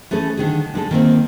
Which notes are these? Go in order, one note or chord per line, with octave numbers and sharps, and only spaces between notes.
E3 A3 C#4 G#4 A4
D3 D#3 G#4
D3 G#3 A4
D#3 A#3 C4